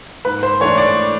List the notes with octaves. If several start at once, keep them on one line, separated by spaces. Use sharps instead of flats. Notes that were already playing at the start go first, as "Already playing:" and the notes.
G#2 B4
C5
E3 A3 D4 C#5
D5